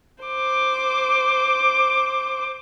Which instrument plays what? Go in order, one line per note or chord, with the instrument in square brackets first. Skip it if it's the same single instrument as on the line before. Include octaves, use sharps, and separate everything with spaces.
[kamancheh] C5 D6